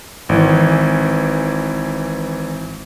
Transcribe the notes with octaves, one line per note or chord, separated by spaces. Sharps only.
G#1 E3